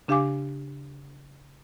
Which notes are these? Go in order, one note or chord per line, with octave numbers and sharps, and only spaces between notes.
C#3 D4 G4 F5 G#5 D6